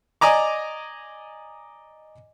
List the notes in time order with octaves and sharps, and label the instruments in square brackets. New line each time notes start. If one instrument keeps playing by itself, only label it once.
[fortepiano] D5 D#5 G#5 A#5 D6